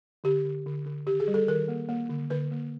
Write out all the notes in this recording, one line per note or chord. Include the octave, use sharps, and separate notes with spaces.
D3 G4
D3
D3
D3
D#3 G4
G#4
G3
A4
D#3 A#4
A#3
A#3
D3
D3 B4
A#3